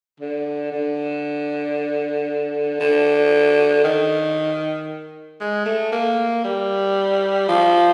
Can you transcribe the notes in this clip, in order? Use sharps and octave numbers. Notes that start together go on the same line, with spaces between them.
D3
D3
D3
D#3
G#3
A3
A#3
G3
F3